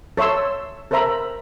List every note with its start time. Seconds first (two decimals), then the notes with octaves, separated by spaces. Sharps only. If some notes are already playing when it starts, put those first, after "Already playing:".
0.17 A4 C#5 E5 C6 E6
0.91 A4 A#4 C5 E5 A#5 B5